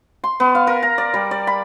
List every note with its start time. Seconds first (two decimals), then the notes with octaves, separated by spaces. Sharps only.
0.24 C6
0.40 B3
0.55 F5
0.67 A#4
0.83 A#5
0.98 D5
1.14 G3
1.31 D5
1.47 B5